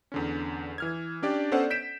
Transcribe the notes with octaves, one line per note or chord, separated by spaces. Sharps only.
E2 D3 C#4
E3 F6 G#6
C#4 D4 G4 D5
B3 C#4 A4 C5 D5 F#5
G6 B6 D7 E7